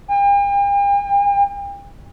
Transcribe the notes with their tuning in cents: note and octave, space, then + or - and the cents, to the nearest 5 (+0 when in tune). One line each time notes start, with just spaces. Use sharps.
G5 +45